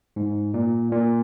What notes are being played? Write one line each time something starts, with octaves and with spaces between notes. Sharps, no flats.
G#2
A#2
A#2